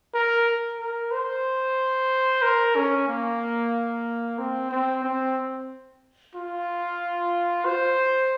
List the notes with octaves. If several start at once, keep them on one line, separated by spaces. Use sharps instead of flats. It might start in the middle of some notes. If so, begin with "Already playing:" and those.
A#4
A#4
C5
A#4
C#4
A#3
C4
C4
C4
F4
C5